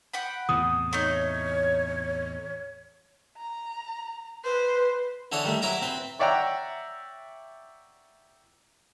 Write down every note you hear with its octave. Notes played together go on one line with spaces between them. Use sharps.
F#5 G5 B5
E2 A2 C3 D#6
A3 D#4 C#5
A#5
B4 C5
D3 E3 A4 C#5 D#6
D#3 G3 A3
F#3 E4 B4 A#5 D6
C4 B4
C#5 D5 E5 F#5 G5 A#5